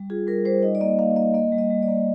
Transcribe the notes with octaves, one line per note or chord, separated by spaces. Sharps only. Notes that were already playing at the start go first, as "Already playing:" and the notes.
Already playing: G3
F4 G#4
G3 A#4
G3 C5
D#4 D#5
D5
A#3 D#5
A#3 F5
A#3 D#5
A#3 D#5
G3
D#5
G3
D5
A#3